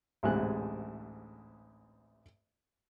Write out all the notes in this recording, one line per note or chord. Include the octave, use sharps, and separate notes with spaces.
A1 D2 G#2 C3 G#4 F#6